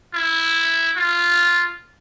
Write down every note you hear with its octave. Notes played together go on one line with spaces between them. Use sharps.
E4
F4